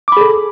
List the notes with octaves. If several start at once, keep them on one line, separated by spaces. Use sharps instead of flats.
G#4 A4 B5 D6